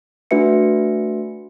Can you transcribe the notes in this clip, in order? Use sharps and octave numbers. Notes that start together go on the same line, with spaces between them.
A3 D4 F#4 B4 E5 C#7